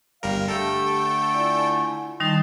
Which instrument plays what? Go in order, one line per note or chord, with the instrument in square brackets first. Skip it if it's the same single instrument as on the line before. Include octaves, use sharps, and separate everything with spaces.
[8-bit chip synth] G1 G3 A#4 [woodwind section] F5
[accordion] D3 A3 [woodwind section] G4 [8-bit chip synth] A4 G5 [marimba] E6
[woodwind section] E4 F4 G#5 [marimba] D5
[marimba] D#3 G3 D#4 [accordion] A5 C6